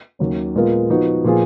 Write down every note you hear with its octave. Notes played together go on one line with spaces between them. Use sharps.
D#2 D#3 F#3 C#4
A#2 G#3 B3 F4 A#4
F3 B3 D#4 F#4
A#2 F3 B3 F4 G#4